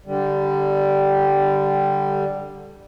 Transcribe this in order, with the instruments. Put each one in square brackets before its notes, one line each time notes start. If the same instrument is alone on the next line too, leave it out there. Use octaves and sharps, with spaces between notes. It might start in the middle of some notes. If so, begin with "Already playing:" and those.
[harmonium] D3 G3